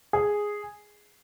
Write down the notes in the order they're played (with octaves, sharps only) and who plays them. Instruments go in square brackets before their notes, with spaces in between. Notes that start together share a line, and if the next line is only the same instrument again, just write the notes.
[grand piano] G#4